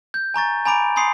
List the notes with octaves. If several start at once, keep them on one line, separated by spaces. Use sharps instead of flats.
G6
G#5 A#5 C#6 A6
G#5 A#5 B5 D6 D7
G#5 B5 C6 D#6 C7 C#7